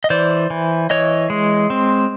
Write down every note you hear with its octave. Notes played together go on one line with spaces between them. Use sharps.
D#5
E3 C5 D5
E3
E3 C#5 D#5
G#3
C4